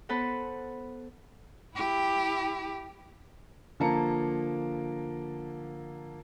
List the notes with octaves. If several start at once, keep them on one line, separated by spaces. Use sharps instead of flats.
B3 A4 B4 C5 F#5
E4 G4
D3 F3 A#3 A5 A#5 C#7